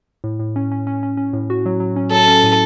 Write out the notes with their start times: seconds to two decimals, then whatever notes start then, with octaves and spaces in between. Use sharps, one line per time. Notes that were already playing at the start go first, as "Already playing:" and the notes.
0.24 A2
0.39 A2
0.56 C#4
0.72 C#4
0.87 C#4
1.03 C#4
1.17 C#4
1.33 A2
1.50 F#4
1.66 F#3
1.80 F#3
1.96 C#4
2.12 F#3 A4
2.28 C#4
2.43 A2